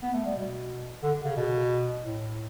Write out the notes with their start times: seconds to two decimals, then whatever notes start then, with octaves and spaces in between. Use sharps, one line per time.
0.03 B3
0.14 A3
0.25 G3
0.36 B2
1.03 D3
1.22 D3
1.25 C#3
1.36 B2
2.04 A2